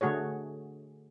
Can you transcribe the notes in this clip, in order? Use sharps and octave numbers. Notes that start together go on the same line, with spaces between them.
D3 A3 F#4 G#4 C#5